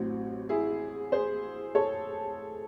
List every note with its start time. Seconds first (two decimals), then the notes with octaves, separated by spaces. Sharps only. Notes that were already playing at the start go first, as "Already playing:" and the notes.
Already playing: A1 A2 F#3 C4
0.49 E4 G#4
1.12 G#4 C5
1.75 A4 C#5